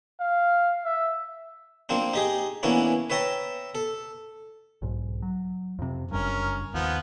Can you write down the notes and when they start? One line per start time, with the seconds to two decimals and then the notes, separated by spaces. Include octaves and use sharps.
0.20 F5
0.85 E5
1.89 F3 A#3 C4 D4
2.13 D#4 G4 G#4
2.63 E3 A#3 B3 C#4 D4 E4
3.10 B4 C#5 E5 G5 A5 A#5
3.75 A4
4.82 B1 G#2
5.22 F#3
5.79 F2 C3
6.11 F#1 G2 C#4 A#4
6.74 D#2 F3 B3